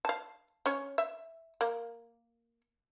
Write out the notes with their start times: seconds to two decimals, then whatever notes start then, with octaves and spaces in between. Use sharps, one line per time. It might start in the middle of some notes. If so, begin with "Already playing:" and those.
0.05 F5 A5
0.66 C#4 C#5
0.98 E5
1.61 A#3